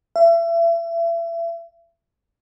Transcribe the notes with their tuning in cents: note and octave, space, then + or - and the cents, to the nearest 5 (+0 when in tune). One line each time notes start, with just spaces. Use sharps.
E5 +35